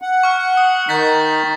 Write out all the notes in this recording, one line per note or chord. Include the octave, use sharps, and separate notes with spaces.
F#5
C#6 F6
D#6
D#3 D#4 G6 A6 B6